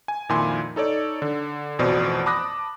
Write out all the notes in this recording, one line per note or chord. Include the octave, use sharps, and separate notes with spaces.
G#5
F2 A#2 D#3 E4 G#5 C6
D#4 A4 C#5 D5
D3
A1 F2 B2 C5 D5
A5 B5 D6 D#6 F#6 A#6